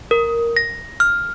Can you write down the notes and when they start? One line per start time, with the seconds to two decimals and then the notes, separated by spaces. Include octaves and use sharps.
0.11 A#4
0.57 A#6
1.00 F6